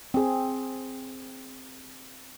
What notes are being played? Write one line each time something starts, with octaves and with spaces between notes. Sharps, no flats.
C4 G#4